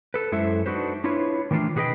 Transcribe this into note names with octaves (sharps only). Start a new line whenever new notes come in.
A4 B4
F#2 G#3 E4 A4 C5 E5
D4 D#4 F#4 B4 C5
D4 E4 F4 B4 C#5
D#3 E3 A3 D4 F4
B2 F#4 G#4 B4 D#5 G5